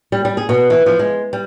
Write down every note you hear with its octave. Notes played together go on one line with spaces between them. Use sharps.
G3
G3
G#4
B2
E3
F3
G#3
G3